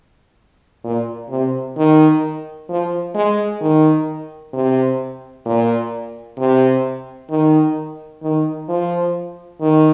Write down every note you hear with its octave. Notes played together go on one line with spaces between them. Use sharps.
A#2
C3
D#3
F3
G#3
D#3
C3
A#2
C3
D#3
D#3
F3
D#3